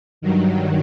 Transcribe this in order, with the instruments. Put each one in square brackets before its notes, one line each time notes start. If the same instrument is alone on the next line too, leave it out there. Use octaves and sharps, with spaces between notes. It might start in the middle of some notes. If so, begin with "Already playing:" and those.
[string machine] G2 D#3 F#3